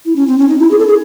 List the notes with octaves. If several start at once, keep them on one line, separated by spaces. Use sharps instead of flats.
E4
C#4
C4
C#4
D#4
E4
G#4
A4
G#4